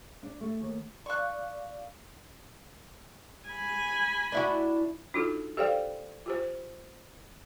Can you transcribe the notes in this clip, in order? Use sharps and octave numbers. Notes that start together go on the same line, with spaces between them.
D4
A3
D#2
D5 F5 C#6 F#6
G#5 B5
D4 E4 F#4
D4 D#4 F4 F#4 A4
G4 A4 C5 D5 F5 G5
F4 G4 C5